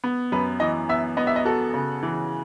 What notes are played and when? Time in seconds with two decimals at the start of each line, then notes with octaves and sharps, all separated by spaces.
0.04 B3
0.32 F#2 B4
0.60 E3 D#5
0.89 B3 E5
1.17 B3 D#5
1.27 E5
1.36 D#5
1.45 F#4 A4
1.74 C#3
2.03 E3